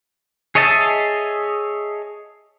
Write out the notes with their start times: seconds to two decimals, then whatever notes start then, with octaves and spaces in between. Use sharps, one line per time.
0.55 G#4 C#5 D#5 E5 A5